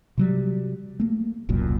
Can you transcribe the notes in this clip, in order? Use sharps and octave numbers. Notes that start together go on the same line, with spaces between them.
C3 F#3 G3
A3 A#3
E1 C2 F#2 A#2